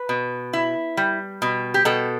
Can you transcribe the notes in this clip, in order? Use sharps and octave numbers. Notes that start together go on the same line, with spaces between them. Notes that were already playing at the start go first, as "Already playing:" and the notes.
Already playing: B4
B2
E4
G3
B2
G4
B2 A4